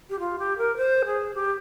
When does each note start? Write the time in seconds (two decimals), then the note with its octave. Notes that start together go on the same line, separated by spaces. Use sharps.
0.10 G4
0.19 F4
0.39 G4
0.58 A#4
0.77 C5
1.06 G#4
1.35 G4